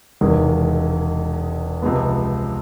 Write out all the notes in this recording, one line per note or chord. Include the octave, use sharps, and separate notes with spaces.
E1 E2 C3 D#3 G#3
C#2 C3 F3 G#3 B3